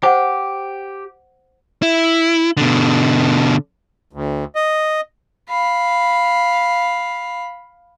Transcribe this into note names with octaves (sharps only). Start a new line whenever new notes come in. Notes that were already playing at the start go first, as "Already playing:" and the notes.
G4 C5 F#5
E4
B2 D3
D2
D#5
F5 B5